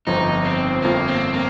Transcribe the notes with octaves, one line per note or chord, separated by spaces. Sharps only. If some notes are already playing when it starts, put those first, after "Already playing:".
G1 F2 F3 D#4
C4
G1 F2 F3 A#3
C4
A#3